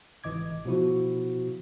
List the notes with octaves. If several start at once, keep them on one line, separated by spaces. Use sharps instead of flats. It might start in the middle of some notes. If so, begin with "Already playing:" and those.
G#1 E3 D#5 D6 G#6
B2 F3 E4 F#4